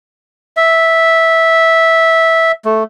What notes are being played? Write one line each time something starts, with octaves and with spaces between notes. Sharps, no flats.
E5
A3